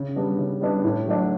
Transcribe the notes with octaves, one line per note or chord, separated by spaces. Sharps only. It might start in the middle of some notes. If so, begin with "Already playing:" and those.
Already playing: C#3
G3 B3 D4
C#3
G3 B3 D4
A2
F#3 A3 D4